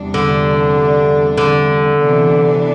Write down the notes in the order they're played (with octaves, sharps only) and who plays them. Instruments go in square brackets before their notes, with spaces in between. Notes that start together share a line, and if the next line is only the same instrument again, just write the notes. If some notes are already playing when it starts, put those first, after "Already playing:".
Already playing: [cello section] E2 C3 G3 D4
[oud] D3
D3
[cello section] C3 E3 B3 D4